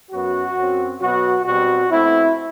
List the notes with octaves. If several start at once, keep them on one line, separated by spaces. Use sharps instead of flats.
F#2 F#3 B3 F#4
F#2 F#3 C4
B2 F#3 B3 F#4
B2 G3 C4 F#4
B2 A3 C4 E4